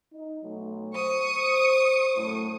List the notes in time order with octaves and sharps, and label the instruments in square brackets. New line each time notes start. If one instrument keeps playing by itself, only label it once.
[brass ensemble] D#4
B1 F#3 A3
[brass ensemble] C5 [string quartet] C#6 D#6
[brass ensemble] F#2 A2